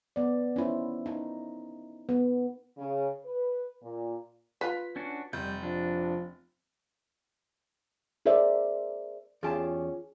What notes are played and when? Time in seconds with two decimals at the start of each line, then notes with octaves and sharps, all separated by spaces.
0.16 B3 D5
0.56 C#4 D#4 E4 C5
1.06 D#4
2.09 B3
2.78 C#3
3.25 B4
3.83 A#2
4.61 F4 B4 B6
4.96 C#4 D4 F#4
5.33 F1 G3 G6
5.63 F3 D4
8.26 G#4 A#4 C5 D5 E5
9.43 E2 C#4 F4 G4 G#4 A5